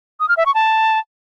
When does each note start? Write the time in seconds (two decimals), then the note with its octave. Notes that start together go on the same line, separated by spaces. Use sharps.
0.20 D#6
0.29 F6
0.37 E5
0.46 C#6
0.54 A5